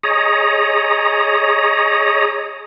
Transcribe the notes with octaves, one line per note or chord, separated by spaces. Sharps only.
G#4 C#5 D#5 A#5